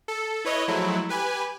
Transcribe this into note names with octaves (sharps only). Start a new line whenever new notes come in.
A4
E4 B4 C#5 D#5
F3 F#3 G#3 A3 E4
G4 B4 G#5